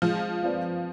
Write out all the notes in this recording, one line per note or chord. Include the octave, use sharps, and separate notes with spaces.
F3 G#3
C4 F4 B4 D5